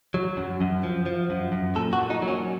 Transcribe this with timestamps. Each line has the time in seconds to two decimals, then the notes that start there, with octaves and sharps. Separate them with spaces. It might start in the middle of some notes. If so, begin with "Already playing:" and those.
0.14 F#3
0.37 F#2
0.61 F#2
0.83 F3
1.06 F3
1.30 F#2
1.52 F#2
1.75 A#2 A4
1.93 F#4
1.99 A#2
2.10 D#4
2.22 F#3
2.28 C#4